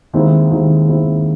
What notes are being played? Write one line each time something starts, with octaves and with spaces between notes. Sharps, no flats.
D#2 D#3 G#3 C4 E4
D#2 D#3 G#3 C4 E4
D#2 D#3 G#3 C4 E4